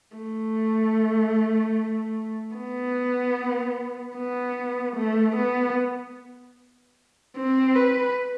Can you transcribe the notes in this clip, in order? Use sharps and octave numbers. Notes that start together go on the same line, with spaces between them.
A3
B3
B3
A3
B3
C4
B4